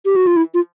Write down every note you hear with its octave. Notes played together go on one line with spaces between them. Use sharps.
G4
F#4
F4
E4
F4